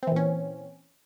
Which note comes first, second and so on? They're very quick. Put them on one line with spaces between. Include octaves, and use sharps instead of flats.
C4 E3 A#2 C#4